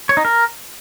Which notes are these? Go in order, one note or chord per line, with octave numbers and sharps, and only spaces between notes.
C#5
D#4
A#4